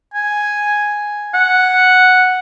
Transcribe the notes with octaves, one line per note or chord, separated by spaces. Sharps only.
G#5
F#5